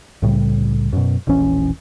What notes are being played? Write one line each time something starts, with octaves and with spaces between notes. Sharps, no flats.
C2 A2 C#3 G3
F#2 B2
E1 A#1 E3 C#4